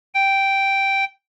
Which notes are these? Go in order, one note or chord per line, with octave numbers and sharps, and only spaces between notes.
G5